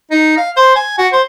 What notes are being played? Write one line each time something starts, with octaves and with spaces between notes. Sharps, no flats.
D#4
F5
C5
G#5
F#4
C5